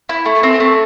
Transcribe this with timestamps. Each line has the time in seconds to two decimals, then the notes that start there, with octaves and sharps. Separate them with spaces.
0.09 E4
0.26 A3
0.43 C4
0.60 A3